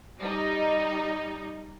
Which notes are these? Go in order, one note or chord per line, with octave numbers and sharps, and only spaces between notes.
G3 D#4